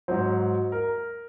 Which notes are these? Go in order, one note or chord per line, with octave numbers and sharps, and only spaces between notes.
G#2 F#3 C5
A#4